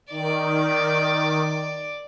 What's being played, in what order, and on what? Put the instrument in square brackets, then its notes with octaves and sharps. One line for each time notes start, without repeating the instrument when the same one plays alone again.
[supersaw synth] D#3 [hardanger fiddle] D5 D6